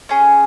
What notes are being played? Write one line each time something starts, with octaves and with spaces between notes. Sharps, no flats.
C#4 G#4